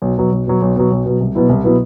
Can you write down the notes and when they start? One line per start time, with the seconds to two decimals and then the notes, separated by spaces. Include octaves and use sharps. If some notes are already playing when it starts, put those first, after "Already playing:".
0.02 B1
0.18 B2 F#3
0.32 B1
0.47 B2 F#3
0.62 B1
0.76 B2 F#3
0.91 B1
1.06 B2 F#3
1.20 C2
1.35 B2 F#3 B3 E4
1.49 C2
1.64 B2 F#3 B3 E4